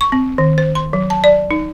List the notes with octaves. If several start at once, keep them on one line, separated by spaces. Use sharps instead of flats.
C#6
C4
D#3
C5
C6
F#3
A5
D5
D#4